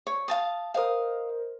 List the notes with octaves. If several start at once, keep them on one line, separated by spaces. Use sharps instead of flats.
C#5
F5 A5 D#6
A#4 C5 D#5 F5 D#6